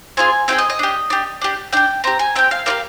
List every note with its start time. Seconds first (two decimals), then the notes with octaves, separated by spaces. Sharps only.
0.17 C4 F4 G#4 G#5
0.48 C4 F4 G#4 G5
0.58 D#5
0.70 D#5
0.79 D4 G4
1.10 D4 G4
1.42 D4 G4
1.73 D4 G4 G5
2.04 C4 G4 A#5
2.19 G#5
2.35 C4 G4 G5
2.51 F5
2.66 A#3 D#4 G4 F5